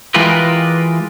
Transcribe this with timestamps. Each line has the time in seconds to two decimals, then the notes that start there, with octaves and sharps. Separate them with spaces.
0.14 E3 G#3 F4 G4 A#4 B4